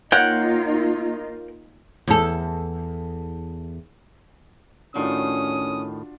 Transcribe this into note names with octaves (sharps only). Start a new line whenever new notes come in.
A#3 D#4 F4 A#4 C#5 F#5 G5
E2 A4
A2 D#3 C#4 D4 F4 F#4 D#6